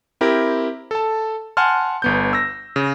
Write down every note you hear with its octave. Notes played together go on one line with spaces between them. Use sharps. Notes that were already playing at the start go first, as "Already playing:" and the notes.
C4 E4 G4 A#4
A4 A5
F#5 G#5 A5 C6 F6
G1 B3 G6
E6 A#6
C#3